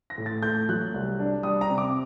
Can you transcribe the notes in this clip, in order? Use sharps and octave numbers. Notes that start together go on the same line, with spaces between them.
A#6
A2
A6
A3 G6
F#3 F#6
C2
D4
G3 D#6
A#5
C3
D6